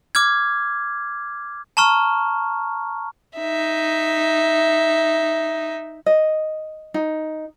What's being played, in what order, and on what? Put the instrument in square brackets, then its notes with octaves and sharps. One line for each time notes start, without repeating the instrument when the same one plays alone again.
[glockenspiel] D6 F6 G#6
A5 A#5 C#6 F6
[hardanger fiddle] D#4 E5
[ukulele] D#5
D#4